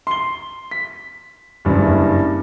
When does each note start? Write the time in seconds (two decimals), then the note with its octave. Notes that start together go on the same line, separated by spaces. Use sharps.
0.07 C6 G7
0.71 B6
1.65 F#1 G2